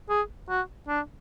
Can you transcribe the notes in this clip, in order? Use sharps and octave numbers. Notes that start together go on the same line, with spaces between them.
G#4
F#4
D4